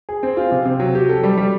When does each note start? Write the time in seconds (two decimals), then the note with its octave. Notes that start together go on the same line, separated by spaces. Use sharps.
0.09 G#4
0.23 C4
0.37 F4
0.52 C3
0.66 C3
0.80 F#3
0.95 G4
1.09 A4
1.24 G3
1.38 G3